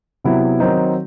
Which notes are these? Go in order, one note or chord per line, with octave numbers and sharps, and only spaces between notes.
C3 F#3 B3 E4
D#3 F#3 C4 D#4